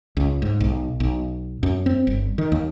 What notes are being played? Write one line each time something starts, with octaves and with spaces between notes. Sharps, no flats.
C#2
G#2
B1
B1
F#2
C4
G1
D#3
D#2